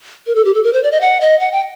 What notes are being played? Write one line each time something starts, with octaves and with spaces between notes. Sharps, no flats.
A#4
A4
G4
A4
A#4
C5
D5
D#5
F#5
D#5
F#5
G5